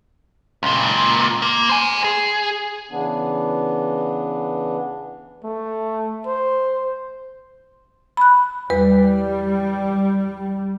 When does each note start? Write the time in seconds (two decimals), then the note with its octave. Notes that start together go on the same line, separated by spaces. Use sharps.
0.63 C#2 A#2
1.42 A#3
1.69 C5 G#5
2.04 G#4
2.91 C#3 E3 B3 D4
5.44 A3
6.26 C5
8.17 B5 F#6
8.70 E2 G3 B4